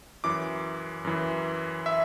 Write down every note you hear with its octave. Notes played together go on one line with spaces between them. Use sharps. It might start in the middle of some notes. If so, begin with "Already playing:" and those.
F#2 E3 D6
F#2 E3
E5